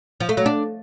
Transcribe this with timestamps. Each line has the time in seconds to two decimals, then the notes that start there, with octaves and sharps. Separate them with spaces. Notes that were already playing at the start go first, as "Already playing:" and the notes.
0.20 F3
0.29 A3
0.37 F#3
0.46 D4